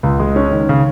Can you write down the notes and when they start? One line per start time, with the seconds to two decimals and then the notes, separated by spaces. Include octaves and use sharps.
0.03 C#2
0.20 G#3
0.36 C#4
0.52 D#3
0.69 C#3